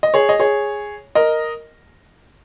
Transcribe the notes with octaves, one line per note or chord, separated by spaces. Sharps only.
D#5
G#4 C#5
D#5
G#4 C#5
A#4 D#5